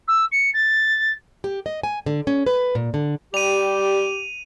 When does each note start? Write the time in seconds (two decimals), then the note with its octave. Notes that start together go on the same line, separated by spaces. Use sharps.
0.08 E6
0.32 C#7
0.54 A6
1.44 G4
1.66 D#5
1.83 G#5
2.06 D3
2.27 C#4
2.46 B4
2.75 A#2
2.94 D3
3.34 G3 G4 D#7 F7